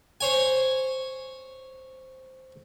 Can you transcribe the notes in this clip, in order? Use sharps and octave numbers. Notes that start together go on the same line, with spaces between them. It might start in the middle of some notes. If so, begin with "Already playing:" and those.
C5 C#5 G#5